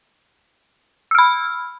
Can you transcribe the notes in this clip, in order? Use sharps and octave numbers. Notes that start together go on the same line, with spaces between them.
B5 E6 F6